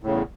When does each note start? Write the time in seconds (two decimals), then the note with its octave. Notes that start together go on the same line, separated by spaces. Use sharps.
0.03 A2
0.07 C#3
0.10 E2